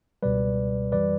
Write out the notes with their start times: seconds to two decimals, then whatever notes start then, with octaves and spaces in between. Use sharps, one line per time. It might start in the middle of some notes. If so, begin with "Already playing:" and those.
0.23 C#2 B2 G3 B4 D5
0.92 F#2 E3 G3 B4 D5